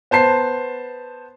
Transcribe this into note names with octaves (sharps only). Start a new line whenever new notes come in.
B3 C5 A5 C7